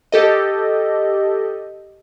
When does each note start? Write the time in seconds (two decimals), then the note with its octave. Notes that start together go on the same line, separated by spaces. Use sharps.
0.12 G4 A4 D#5